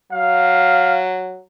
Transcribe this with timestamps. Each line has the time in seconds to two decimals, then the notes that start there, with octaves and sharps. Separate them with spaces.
0.12 F#3 F5